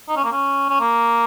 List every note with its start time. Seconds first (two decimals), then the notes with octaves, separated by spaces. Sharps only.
0.09 D#4
0.17 C#4
0.24 A#3
0.32 C#4
0.69 C#4
0.80 A#3